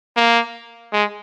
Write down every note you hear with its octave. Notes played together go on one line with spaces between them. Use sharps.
A#3
G#3